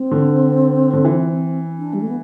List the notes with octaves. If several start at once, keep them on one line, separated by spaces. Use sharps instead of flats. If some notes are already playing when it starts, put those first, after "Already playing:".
Already playing: C4
D3
D3
E3
D4
G3
A3
B3